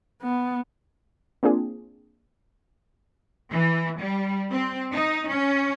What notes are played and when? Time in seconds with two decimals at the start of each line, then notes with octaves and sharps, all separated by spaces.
0.22 B3
1.43 A#3 C4 D4 F4 G#4
3.52 E3
3.99 G3
4.51 C4
4.93 D#4
5.31 C#4